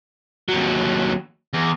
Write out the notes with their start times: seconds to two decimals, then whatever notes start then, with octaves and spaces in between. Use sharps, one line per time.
0.49 D#2 F#3
1.54 E2